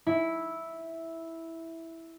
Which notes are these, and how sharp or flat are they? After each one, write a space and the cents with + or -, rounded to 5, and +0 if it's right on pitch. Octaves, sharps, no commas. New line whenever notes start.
E4 -5